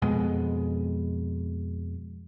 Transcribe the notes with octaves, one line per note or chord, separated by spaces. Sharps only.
F2 B2 G#3